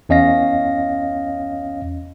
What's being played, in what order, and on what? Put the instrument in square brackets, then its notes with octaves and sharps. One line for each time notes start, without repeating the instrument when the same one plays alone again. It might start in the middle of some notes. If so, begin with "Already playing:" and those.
[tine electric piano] E2 C#4 D#5 F5 A#6